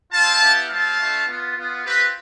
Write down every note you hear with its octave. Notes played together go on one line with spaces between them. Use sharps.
C4 F4 F5 A5
B3 E4 G4
G3 C4 F4 F5 A5
A3 D4 F4
B3 F4
B3 F4
C4 F4 G4 B4